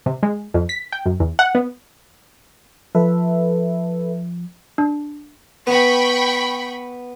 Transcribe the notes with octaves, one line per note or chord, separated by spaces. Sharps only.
C3
G#3
F2
B6
G5
F#2
E2
F#5
B3
F3 A4 B4 E5
D4
B3 G5 B5 C#6